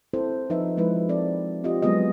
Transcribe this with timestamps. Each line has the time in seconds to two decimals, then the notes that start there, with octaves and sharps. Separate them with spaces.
0.13 C4 E4 A4 C5
0.50 F3 D#4 B4 E5
0.77 F3 G#3 E4 B4
1.09 C4 D#4 A4 D5
1.64 C4 F4 G4 D#5
1.82 F#3 G#3 B3 G#4 D#5